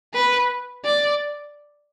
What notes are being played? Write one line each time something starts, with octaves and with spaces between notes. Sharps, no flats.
B4
D5